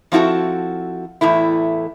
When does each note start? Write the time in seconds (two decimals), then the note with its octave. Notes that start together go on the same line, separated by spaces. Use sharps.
0.12 F3 C4 E4 F#4 A4
1.21 E2 A2 A3 E4